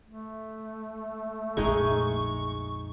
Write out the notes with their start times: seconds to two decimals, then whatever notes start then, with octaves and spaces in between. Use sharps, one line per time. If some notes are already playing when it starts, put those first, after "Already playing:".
0.06 A3
1.57 A#1 F2 G#3 D#4 G#4 C#6